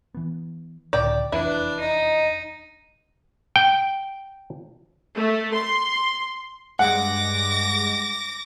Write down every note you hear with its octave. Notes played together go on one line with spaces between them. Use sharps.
E3 B3
C#2 A2 D3 D5 G5
F1 E2 D4 E4 B4
D#4 D#5
G5
A3
C6
G2 G#3 F#5 D6 A#6